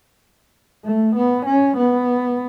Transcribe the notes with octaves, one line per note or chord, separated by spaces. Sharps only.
A3
B3
C#4
B3